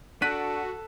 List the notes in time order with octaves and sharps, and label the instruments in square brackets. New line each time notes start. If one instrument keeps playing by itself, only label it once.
[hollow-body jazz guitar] D4 [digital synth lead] F#4 [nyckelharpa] A4 [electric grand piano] F#6 B6 D#7